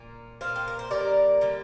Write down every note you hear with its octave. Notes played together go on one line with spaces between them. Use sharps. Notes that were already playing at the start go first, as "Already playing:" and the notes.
Already playing: A#2 A#3
A#2 A#3 C5 F5
G4
A#4
C5
D3 G3 A#3 A#4 D5
D3 G3 A#3